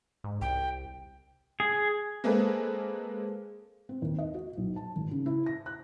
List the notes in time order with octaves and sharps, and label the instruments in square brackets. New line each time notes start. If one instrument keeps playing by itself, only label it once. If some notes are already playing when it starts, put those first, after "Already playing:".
[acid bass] G#2
[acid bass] C2 [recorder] G5
[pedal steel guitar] G#4
[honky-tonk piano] G#3 A#3 C4 G#4 A4 B4
[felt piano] C4
D#2
D#5
F#4
B1
A5
G#1
C#3
E4
A#6
F#6